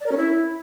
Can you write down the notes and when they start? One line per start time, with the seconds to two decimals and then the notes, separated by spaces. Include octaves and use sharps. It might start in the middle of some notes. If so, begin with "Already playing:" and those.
0.01 D5
0.06 A#4
0.11 C#4
0.17 E4